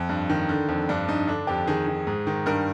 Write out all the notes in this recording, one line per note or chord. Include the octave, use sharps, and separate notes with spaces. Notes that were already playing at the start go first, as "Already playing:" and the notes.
Already playing: F2
G2
D#3
D3
F2
G2 D4
G2 D#4
D3 D4
F2 G4
D#3 G#4
D#3
G#2
D#3
G2 A#4